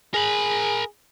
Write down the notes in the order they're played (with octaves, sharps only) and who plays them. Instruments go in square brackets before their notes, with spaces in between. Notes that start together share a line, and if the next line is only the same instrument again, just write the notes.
[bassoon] G#4 [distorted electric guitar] A#4 B5